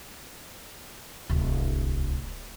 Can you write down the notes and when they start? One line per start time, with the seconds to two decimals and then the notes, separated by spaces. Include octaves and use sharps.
1.30 D1 C2